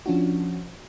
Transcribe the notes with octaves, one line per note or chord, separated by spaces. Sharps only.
F3 C#4 D4 F4 F#4